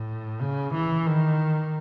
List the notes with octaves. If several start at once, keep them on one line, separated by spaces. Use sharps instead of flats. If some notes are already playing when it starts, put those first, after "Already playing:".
Already playing: A2
C#3
E3
D#3